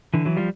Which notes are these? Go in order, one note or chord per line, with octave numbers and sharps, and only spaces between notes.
D3 E3
E3 F#3
F3 G3